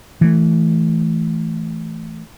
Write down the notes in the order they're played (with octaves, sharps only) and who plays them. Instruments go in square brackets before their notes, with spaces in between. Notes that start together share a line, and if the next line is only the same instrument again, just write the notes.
[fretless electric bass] E3 A3